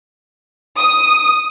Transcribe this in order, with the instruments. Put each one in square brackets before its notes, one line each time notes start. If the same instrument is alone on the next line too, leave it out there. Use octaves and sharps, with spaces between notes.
[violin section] D#6